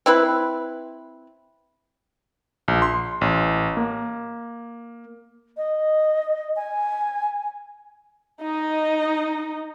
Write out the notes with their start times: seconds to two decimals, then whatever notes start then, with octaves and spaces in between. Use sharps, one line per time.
0.06 C4 E4 B4
2.68 A#1
2.82 C6
3.21 A1
3.77 A#3
5.57 D#5
6.56 G#5
8.41 D#4 D#5